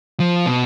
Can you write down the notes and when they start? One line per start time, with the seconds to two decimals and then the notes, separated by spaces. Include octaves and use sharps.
0.20 F3
0.46 B2